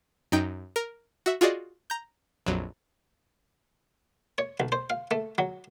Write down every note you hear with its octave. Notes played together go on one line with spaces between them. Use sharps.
F#2 D#4 G5 G6
A#4
F#4 E5
F4 F#4 G#4 D5 D#5
A#5 G6
A#1 F2 F#3
C#5
B1
C5
F5
A3
F#3